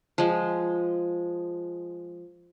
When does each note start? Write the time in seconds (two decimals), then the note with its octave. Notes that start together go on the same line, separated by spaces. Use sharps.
0.18 F3 G#3